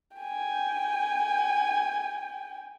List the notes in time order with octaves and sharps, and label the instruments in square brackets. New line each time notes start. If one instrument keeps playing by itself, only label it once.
[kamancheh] G5 G#5